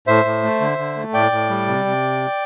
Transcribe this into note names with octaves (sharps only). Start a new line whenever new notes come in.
A2 C5 E5
A2
A3
D3
D3
A3
A2 D5 G5
A2
G3
C3
C3